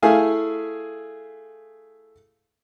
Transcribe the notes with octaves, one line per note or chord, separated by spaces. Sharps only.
A3 E4 G#4 F5 G#5